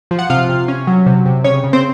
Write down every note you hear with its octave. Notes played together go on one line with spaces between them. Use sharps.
F3
F#5
C3 F4 F5
C3
C#4
F#3
C3
C3
C#3 C#4 C#5
C#3
C4 C5